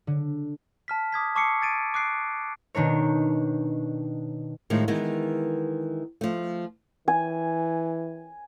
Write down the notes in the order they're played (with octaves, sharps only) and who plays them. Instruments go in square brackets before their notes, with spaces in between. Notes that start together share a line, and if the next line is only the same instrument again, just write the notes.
[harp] D3
[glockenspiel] A5 F6 B6
D6 D#6 G#6 B6
A5 C#6 D6 E6 C7 C#7
G#6 A6 D7 D#7
D6 F#6 C7 D7
[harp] B2 D#3 D4 A#4 C#5
[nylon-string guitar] A2 D#3 F3 G#3
D#3 E3 G#3 B3
F3 A3
[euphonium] E3 [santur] G#5